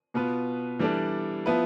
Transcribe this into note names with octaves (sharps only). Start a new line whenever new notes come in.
B2 B3 F4 B4
E3 G3 D4 A4
F3 B3 E4 B4